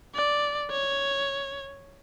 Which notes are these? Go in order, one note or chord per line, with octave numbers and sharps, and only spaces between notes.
D5
C#5